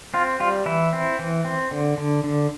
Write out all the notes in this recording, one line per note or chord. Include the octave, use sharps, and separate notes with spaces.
C4 F4
G3 F4
E3 E4
C4
E3
C4
D3
D3
D3